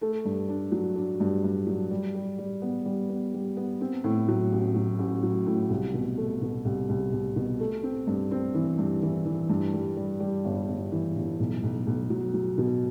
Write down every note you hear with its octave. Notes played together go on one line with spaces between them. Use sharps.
A3
G2
D4
F#3
D4
G2
G2
F#3
G3
G3
G3
B3
G3
B3
G3
B3
C4
A2
F#3
A1
F#3
A1
F#3
A2
C2
B2
A3
B2
C2
C2
C2
B2
A3
C4
G2
C4
E3
G2
E3
E3
G2
G3
G3
G3
G1
G1
E3
G1
B1
B1
B1
F#3
F#3
B2